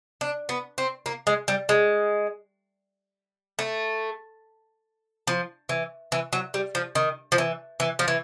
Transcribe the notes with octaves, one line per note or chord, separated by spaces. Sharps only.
D4
B3
C4
A#3
G#3
G3
G#3
A3
F3
E3
E3
F#3
G3
F3
D#3
F3
E3
E3
F3
E3